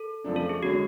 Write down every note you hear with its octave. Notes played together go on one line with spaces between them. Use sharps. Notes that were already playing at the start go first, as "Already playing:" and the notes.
Already playing: A4
F2 C#3 F3 A3 D4
A4
G#4
D3 G#3 C#4 F#4